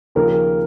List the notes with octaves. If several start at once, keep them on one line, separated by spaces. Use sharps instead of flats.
D#2 C#3 F3 A#3 A#4